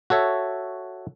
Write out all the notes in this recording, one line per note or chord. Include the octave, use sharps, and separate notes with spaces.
F#4 A4 C#5 E5